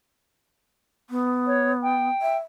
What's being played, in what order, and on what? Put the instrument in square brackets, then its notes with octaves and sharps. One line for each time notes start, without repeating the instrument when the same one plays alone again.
[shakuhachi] B3
[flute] C#5
G5
[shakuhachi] E5